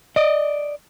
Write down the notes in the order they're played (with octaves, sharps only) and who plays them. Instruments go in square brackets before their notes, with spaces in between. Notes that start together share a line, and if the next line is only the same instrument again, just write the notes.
[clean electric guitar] D5 D#5